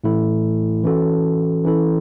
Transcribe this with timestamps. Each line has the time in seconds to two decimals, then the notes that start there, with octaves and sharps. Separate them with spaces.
0.04 A2 E3 A3 E4 A4
0.84 E3 C#4 F#4 A4
1.64 E3 C#4 E4 A4